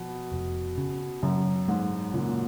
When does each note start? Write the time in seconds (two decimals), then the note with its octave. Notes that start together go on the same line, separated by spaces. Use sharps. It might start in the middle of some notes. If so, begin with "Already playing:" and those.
Already playing: B2 F3
0.32 F1
0.78 C#3
1.23 F#2 C#3
1.68 G#2 G#3
2.13 A#2 C#3